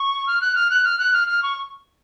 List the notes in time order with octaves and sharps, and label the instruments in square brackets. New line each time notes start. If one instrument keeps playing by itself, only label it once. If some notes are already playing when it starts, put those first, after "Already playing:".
Already playing: [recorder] C#6
F6
F#6
F6
F#6
F6
F#6
F6
F6
C#6